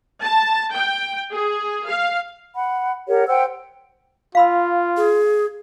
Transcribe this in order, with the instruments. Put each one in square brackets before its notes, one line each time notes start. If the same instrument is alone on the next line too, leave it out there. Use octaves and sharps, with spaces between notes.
[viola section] A5
G5
G#4
F5
[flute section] F#5 B5
G4 A#4 C#5 F#5
C5 F#5 G5 E6
[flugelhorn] F4 [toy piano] F5 B5 E6
[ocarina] G#4